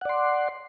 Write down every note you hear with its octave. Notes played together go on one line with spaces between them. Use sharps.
D5 F#5 C6